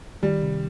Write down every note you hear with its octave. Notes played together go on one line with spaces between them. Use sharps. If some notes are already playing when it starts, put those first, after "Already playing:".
D#3 G3
C3